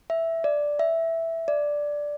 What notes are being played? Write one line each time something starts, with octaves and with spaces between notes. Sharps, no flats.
E5
D5
E5
D5